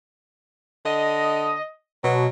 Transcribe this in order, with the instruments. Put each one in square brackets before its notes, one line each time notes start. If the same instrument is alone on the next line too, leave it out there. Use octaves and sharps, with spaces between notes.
[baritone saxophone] D3 [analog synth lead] D#5
[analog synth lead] B2 [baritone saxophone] F#3